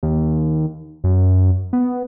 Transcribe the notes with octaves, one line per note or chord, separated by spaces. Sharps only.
D#2
F#2
B3